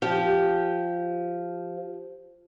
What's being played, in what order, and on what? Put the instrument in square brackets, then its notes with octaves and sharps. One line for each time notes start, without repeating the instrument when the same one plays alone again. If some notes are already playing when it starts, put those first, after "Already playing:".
[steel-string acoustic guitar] F3 [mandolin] G4